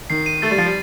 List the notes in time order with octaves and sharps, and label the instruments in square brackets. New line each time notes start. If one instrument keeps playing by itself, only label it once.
[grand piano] D#3 [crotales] C7
[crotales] D#7
[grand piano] A3 [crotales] A6
[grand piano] G3
[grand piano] F3 [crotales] A6
[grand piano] G3